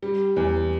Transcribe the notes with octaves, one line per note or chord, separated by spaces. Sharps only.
G3
E2